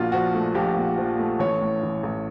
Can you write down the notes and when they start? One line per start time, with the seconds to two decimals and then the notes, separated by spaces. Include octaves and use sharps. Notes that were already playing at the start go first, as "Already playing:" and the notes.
Already playing: A#1 A#2 F4 F#4
0.12 F3 F#4
0.34 A3
0.54 A#1 G4
0.76 A#2
0.98 F3
1.19 A3
1.39 A1 C#5
1.61 A2
1.83 E3
2.03 A1